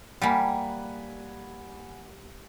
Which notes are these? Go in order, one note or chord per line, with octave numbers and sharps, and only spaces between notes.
G3 A#3 F#5 G#5 B5